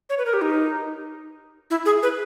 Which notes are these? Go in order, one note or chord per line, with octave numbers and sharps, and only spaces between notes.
C#5
B4
A#4
G4
D#4
E4
G#4
B4